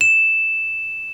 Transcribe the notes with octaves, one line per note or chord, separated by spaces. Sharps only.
E7